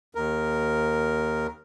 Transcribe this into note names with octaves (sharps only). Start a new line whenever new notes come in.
D#2 A#4